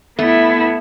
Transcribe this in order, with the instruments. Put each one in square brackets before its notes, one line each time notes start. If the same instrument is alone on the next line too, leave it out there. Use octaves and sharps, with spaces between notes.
[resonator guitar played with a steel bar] A3 [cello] B3 E4